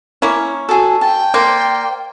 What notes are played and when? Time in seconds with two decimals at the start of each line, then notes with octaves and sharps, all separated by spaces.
0.22 A#3 C#4 E4
0.69 F#4 G#4 A4
1.01 G5 A5
1.34 A#3 C5 D5